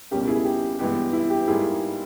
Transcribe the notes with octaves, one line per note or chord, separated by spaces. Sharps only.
C#2 B2 G3 A#3 C#4 G4
E4 G#4
G4
G2 E3 G#3 B3 G4
E4
G4
G#2 G3 A#3 E4 G#4